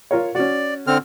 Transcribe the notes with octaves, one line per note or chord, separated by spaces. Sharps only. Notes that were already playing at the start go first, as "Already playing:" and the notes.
F4 A#4 C#5
C#4 F#4 D5
D3 C4 F6